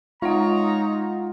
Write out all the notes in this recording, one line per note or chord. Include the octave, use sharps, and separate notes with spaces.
G#3 D#4 F4 C#5 F#5 A#5